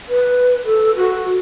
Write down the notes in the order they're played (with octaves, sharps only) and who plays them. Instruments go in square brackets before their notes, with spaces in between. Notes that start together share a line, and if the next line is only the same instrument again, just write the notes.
[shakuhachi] B4
A4
F#4